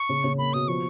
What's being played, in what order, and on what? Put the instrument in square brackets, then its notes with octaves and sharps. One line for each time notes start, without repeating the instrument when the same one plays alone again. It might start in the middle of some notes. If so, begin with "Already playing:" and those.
Already playing: [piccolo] C#6
[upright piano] C#3
C#3
[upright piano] A#3 [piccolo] B5
[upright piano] B2 [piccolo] D#6
[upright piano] F3 [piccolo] C#6